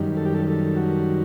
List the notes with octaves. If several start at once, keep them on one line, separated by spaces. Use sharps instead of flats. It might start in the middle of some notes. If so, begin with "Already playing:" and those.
Already playing: F#2 D#3 G3
A4
G4
A4
A4
F#4